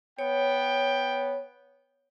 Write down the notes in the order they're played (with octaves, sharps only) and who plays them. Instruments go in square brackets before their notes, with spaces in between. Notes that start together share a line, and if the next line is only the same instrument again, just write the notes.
[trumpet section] B3 G5 [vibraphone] C#5